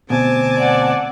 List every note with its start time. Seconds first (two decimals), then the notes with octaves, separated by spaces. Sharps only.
0.10 D2 B2 C4 G#5 A5 D6
0.58 D5 F#5